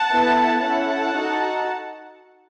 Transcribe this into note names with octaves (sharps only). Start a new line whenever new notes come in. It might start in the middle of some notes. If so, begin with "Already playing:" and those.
Already playing: F#5 A5
B3 E4 A4
C#4 E4 A4 F#5 A5
D#4 F#4 A4